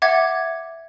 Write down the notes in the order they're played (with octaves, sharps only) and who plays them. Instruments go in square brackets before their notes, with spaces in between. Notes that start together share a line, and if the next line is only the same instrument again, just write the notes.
[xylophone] E5 F#5 D6 G#6 A6